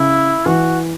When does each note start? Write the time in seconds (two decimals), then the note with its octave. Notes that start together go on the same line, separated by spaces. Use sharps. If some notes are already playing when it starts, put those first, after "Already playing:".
Already playing: C#3 E4
0.46 E3 F#4